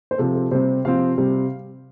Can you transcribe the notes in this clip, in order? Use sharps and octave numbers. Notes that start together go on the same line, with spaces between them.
C5
C3 F3 C4 A4
A4
C3 G3 C4 C5
C3 F3 C4 F5
C3 G3 C4